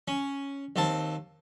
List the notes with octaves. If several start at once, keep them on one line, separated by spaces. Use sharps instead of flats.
C#4
D#2 C4 A5